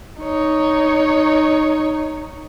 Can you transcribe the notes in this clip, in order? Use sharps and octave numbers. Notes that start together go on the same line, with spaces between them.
D#4 C#5